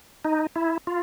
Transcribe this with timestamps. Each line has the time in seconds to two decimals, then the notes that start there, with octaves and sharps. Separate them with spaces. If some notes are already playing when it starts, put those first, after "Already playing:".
0.25 D#4
0.56 E4
0.87 F4